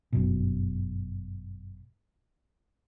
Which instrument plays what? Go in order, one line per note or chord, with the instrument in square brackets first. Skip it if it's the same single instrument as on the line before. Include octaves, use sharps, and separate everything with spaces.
[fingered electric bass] G1 F#2 B2